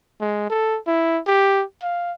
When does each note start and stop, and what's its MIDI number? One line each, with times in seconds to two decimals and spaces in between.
0.20 0.47 56
0.50 0.78 69
0.87 1.19 64
1.27 1.63 67
1.82 2.12 77